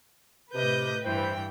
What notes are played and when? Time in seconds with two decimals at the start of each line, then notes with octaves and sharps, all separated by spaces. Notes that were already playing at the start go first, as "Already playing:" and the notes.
0.54 A2 C3 B4 D#5 G6
1.04 G2 E3 E4 C5 G5